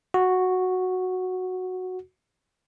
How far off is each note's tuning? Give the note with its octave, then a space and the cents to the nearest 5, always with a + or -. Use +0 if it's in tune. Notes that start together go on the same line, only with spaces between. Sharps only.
F#4 -5